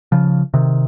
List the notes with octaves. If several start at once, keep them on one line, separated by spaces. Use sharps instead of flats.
C#3 F3
C3 D#3